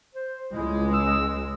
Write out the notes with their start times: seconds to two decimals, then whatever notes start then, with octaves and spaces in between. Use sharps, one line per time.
0.15 C5
0.53 C#2 G#3 E4
0.94 E6